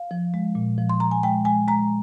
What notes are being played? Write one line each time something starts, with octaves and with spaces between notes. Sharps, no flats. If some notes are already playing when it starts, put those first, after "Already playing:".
Already playing: F5
F3
G#3
A#2
F3
C6
F3 A#5
G#5
G#3 G5
G#3 G#5
G#3 A#5